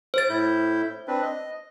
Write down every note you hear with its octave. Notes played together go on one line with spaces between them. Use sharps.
C5 A6
A2 E4 G6
C4 D4 B4
D#5